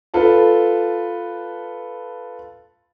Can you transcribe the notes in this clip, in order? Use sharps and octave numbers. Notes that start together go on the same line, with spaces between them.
F4 A4 B4 A5